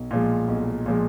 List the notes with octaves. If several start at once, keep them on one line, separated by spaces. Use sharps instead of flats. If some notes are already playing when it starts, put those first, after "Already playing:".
Already playing: B1
A#2 F3 G#3
B1
A#2 F3 G#3